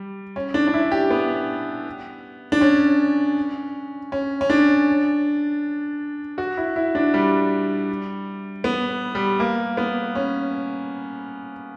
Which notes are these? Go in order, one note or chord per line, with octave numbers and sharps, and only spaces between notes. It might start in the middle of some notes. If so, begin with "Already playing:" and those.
Already playing: G3
C#4
D4
D4
E4
G4
B3
D4
C#4
C#4
C#4
D4
F#4
E4
E4
D4
G3
B3
G3
A#3
B3
C#4